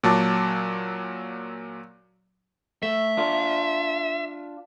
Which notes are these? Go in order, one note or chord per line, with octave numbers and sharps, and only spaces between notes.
A#2 F#3 A5 D6
A3 E5
D4 F4